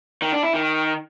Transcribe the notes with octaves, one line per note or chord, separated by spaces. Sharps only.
D#3
D4
E4
D#3